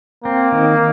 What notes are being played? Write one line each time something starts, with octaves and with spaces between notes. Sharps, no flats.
A#3 C4
D#3